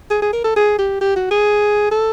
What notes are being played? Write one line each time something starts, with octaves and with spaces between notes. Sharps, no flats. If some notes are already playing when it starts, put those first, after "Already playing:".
G#4
G#4
A#4
A4
G#4
G4
G4
F#4
G#4
A4